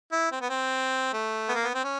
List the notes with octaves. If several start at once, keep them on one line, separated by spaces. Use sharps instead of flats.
E4
C4
B3
C4
A3
B3
A#3
B3
C4
C#4